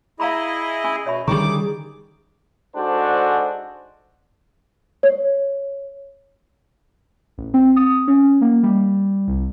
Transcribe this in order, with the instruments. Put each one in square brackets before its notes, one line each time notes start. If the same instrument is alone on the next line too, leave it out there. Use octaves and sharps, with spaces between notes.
[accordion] E4 G#4 D#5 [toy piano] F5 A#5 B5
[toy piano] C#4 G#5 B5
[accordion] B2 [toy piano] C#5 E5 B5
[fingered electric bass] D3 D#3 G3 [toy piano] C#4 A#5 C#6 [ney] G#4 [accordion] D6
[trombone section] G#2 G#3 D4 F#4 A4 C5
[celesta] C#5
[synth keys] A1
C4
D#6
C#4
A#3
G3
C2